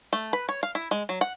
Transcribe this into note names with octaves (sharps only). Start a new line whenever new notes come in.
A3
B4
C#5
F5
E4
G#3
F#3
F#5